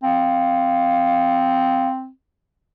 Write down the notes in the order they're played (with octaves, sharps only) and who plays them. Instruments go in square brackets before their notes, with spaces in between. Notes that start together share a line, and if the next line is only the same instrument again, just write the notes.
[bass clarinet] C4 [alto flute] F5